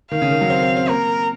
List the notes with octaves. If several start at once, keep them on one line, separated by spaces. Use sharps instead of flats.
D#3 F5
C#3
D#3
F#3
C4
C4
C4
A#3 A#4